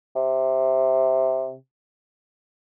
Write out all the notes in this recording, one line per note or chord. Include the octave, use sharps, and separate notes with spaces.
C3